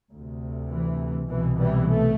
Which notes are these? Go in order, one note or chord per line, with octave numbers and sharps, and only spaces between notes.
D2 C3
E3
C2 B2 E3
E3 G3
A3